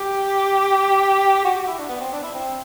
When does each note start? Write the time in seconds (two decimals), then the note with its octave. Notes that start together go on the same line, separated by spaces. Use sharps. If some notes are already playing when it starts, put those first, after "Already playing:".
Already playing: G4
1.45 F#4
1.55 F#4
1.67 E4
1.78 D4
1.89 B3
2.01 C4
2.13 D4
2.23 E4
2.34 C4